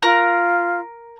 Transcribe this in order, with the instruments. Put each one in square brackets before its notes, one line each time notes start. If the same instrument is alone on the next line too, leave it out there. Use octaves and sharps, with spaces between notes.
[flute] F4 [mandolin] A#4 A#5 F#6